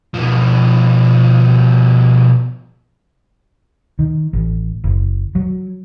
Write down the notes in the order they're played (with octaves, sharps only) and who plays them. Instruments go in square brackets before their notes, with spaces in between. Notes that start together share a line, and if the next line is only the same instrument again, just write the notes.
[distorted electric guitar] B2 F3
[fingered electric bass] D#3
A1
F#1
F#3